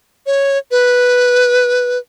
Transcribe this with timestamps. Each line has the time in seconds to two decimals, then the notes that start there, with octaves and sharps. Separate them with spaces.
0.26 C#5
0.71 B4